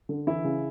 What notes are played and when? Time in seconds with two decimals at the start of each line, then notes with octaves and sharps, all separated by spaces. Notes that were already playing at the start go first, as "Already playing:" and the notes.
0.09 D3
0.27 E3 E4
0.44 C#3